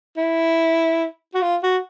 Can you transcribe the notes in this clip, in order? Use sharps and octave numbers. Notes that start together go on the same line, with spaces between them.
E4
F#4
F4
F#4